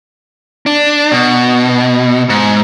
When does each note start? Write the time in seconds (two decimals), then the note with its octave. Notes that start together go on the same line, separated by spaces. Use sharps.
0.66 D4
1.12 B2
2.29 G#2